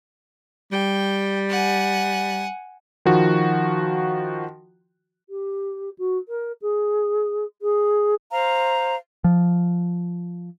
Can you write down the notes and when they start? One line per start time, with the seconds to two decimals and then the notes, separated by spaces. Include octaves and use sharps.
0.72 G3 G5
1.50 F#5 G#5
3.05 D#3 F3 F#4
5.29 G4
5.98 F#4
6.28 A#4
6.61 G#4
7.61 G#4
8.32 C5 F5 A#5
9.24 F3